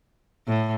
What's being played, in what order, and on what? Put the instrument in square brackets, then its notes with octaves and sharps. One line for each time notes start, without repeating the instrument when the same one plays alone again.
[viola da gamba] A2